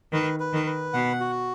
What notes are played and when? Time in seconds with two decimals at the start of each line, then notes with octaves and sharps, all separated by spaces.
0.12 D#3 B4
0.40 B4
0.53 D#3
0.66 B4
0.94 B2 F#5
1.20 F#4